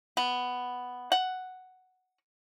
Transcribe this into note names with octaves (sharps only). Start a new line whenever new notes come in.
B3
F#5